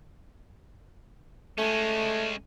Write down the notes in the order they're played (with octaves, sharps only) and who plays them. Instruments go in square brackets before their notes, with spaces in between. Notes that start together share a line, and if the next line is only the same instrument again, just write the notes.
[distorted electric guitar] G#3 C#4 [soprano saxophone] A3